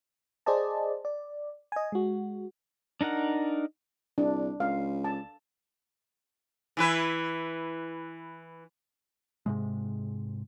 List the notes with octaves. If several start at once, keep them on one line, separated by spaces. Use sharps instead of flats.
G#4 C5 D5 D#5 A5
D5
D#5 G#5
G#3 F#4
D4 D#4 A#4 F#5
C2 D4
C#2 F5
A5
E3 E4 B4
G#2 C3 G#3